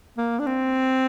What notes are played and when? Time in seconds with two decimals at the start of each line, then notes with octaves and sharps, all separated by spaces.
0.17 A#3
0.39 D4
0.47 C4